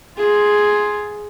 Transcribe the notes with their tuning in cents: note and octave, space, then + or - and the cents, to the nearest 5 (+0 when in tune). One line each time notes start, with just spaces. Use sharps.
F4 +0 G#4 +5